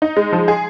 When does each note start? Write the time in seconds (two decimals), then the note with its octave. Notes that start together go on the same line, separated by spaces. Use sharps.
0.02 D#4
0.17 G#3
0.33 F3
0.48 G#4